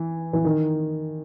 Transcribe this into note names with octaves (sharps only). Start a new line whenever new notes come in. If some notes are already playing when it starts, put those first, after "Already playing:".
Already playing: E3
E3
D#3